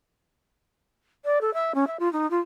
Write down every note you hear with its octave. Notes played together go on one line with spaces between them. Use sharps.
D5
A4
E5
C#4
E5
F4
D#4
F4